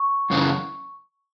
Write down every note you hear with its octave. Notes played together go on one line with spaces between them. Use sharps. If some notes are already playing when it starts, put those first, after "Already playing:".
Already playing: C#6
F#2 C#3 E3